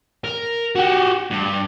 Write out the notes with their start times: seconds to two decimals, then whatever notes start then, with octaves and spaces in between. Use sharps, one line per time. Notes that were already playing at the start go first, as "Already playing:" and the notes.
0.24 A#4
0.75 F#4 G4
1.31 G2